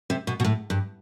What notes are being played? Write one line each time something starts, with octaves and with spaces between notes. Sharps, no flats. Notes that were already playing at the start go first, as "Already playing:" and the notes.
C3
B2
B2
A2
G2